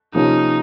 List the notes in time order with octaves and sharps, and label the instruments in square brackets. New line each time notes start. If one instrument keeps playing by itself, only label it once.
[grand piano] C3 F3 A#3 C#4 F4 [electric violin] D#4